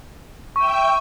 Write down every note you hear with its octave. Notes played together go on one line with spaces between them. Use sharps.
E5 G5 C#6 E6